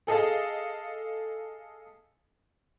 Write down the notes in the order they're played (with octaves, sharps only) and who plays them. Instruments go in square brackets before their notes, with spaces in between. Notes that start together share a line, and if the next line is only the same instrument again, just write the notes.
[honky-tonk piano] G#4 A4 D#5 F5 A5